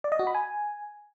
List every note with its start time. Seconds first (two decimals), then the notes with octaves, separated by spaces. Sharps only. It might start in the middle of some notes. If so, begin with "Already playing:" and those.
0.04 D5
0.12 D#5
0.19 F#4
0.27 B5
0.35 G#5